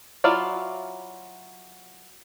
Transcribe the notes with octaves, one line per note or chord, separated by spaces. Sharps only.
F#3 E4 F4 D5 F5